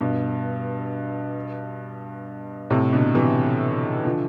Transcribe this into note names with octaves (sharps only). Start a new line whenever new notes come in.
G2 B2
A2 C3
B2 D3
C3 E3
D3 F3